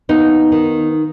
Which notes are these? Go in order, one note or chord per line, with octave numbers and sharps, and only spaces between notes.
D#2 B3 D#4
D#3